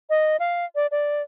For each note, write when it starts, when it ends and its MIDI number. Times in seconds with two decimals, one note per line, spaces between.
0.10 0.37 75
0.40 0.65 77
0.75 0.87 74
0.91 1.22 74